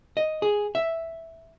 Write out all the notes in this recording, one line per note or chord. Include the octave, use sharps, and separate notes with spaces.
D#5
G#4
E5